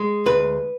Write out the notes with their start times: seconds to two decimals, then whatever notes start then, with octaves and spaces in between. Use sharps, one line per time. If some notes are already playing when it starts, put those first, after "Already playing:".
Already playing: G#3
0.26 D2 B4